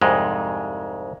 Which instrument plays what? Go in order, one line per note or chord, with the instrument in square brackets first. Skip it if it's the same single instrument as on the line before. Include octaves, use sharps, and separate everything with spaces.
[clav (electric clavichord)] C2 F2 G#2 G#3